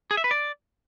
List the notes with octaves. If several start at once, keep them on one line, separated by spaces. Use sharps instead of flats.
G#4
E5
B4
D5